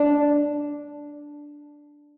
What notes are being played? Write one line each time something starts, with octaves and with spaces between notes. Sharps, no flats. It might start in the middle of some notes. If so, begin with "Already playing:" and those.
Already playing: D4